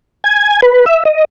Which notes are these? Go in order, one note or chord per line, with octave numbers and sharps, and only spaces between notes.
G#5
B4
E5
D#5